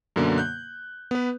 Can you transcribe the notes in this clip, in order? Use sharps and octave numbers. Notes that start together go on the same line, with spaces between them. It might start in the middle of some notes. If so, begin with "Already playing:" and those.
F#2 B2 D3 A#3
F#6 G6
B3 B4